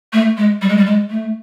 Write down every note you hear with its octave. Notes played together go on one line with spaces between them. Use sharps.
A3
G#3
G3
G#3
G3
G#3
A3